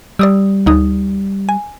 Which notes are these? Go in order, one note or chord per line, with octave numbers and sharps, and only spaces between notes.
G3 D5 D#6 E6
D2 D#4 D#6
G#5